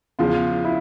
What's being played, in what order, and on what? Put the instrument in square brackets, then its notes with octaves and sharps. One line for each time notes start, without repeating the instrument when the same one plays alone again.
[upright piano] E2 C#3 F3 [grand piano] F4
[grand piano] E4